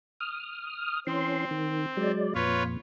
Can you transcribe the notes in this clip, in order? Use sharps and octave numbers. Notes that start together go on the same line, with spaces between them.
D#6 F6
E3 C4 C#4 C6
D#3
F#3 G#3 D5
F2 A#2 F4 B4 C#5